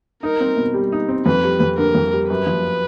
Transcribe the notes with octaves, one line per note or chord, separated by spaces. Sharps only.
D#4 A#4
C4
B2
G3
D#4
C4
F2 B4
G3
F2
D3 A#4
F2
G3
F#2 B4
F3